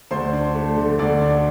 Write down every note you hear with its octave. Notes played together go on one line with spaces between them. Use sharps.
D2 C5 C6
D4
A3
D3
D2 D5 D6
D4